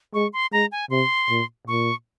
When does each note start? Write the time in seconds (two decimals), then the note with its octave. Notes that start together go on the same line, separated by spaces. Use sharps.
0.14 G#3 C#6
0.33 C6
0.52 G#3 A#5
0.72 G#5
0.90 C3 C6
1.29 A#2
1.67 A#2 C#6